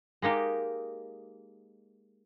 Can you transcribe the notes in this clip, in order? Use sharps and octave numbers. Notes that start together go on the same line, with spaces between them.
G#3 A#3 D#4 G4